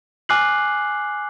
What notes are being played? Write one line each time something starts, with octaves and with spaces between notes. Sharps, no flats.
G#5 D6 F6 F#6 C7 F#7